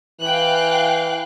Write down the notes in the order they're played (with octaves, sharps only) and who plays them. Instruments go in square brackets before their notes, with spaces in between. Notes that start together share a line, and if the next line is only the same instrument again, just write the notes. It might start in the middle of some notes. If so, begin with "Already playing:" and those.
[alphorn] E3 [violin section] F5 G5 F#6